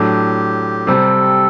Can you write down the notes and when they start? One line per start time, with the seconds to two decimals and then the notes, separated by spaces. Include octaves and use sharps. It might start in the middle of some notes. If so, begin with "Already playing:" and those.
Already playing: A2 F#3 A3 D4 G4
0.87 C3 G3 C4 A4